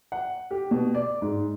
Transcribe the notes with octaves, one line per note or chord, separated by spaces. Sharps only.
F#5
G4
B2
D5
G#2